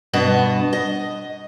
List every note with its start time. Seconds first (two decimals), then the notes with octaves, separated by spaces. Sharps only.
0.13 G2 B2 B3 D#5 A5
0.73 D#5